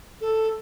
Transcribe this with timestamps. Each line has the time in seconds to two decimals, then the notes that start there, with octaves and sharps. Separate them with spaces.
0.21 A4